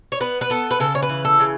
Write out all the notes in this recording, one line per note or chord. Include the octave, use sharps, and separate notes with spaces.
C#5
B3 B4
B4
B3 A4
B4
C#3 A4
C#5
B4
E3
A4
C#3